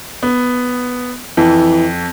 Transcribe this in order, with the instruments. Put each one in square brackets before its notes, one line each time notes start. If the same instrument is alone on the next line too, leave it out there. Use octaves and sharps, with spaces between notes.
[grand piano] B3
[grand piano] F2 [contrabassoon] E3